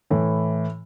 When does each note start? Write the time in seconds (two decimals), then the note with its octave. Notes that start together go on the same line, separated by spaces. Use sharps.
0.10 A2 E3